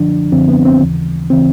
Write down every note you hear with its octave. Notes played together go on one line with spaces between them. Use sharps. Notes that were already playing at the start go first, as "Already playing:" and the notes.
Already playing: F#2 D3 F3 D4
F#2 D3 F3 C4
B3
C4
D#2 C#3 E3
C#3 E3 C4